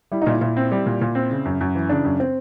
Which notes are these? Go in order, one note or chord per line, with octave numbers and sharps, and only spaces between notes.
G3 E4
D#4
A#2 E4
A#2 E4
C4
G3
A#2
A#2
C4
C#3
F#2
F#2
E3
C#3 D4
F#2
C4